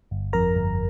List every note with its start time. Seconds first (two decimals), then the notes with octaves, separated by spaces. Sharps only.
0.11 G1
0.33 F2 A#4 A#5
0.55 G1